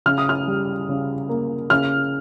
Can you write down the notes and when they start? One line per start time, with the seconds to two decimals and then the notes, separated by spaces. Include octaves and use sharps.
0.06 C#3 F6
0.18 D#6
0.29 F6
0.47 G3
0.89 C#3
1.29 A#3
1.70 C#3 F6